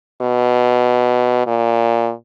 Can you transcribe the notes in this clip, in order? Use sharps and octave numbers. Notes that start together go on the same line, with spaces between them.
B2
A#2